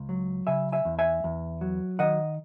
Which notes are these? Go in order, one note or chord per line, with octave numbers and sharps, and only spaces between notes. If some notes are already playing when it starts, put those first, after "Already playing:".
Already playing: C#2
F#3
C#3 E5 G#5
E5 G#5
E2
E5 G#5
E2
F#3
D#3 D#5 F#5